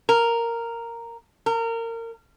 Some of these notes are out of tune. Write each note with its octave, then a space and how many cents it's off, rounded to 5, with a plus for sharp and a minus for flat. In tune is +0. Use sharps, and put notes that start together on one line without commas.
A#4 -5
A#4 -25